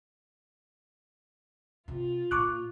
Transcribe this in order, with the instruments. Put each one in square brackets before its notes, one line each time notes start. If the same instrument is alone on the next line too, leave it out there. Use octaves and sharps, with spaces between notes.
[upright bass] C3 [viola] F4
[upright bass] A#2 [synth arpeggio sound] C#6 D6 F#6